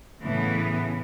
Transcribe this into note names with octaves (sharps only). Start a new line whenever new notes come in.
A2 C#3 E3 B3